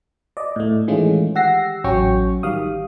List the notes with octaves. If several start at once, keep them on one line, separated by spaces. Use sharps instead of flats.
D5 D#5
A2 A3
D#3 E3 G#3 A3 C#4 F4
G4 F#5 E6 A#6 C7
A1 F#3 C#4 F#4 G5 C#6
D#3 G3 F5 D#6